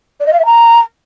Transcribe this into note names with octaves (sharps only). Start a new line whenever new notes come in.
D5
D#5
F5
E5
A#5